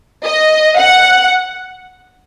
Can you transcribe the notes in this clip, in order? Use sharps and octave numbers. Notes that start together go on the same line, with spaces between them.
D#5
F#5